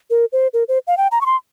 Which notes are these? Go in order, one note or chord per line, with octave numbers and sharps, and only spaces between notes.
A#4
C5
A#4
C5
F5
G5
A#5
C#6
C6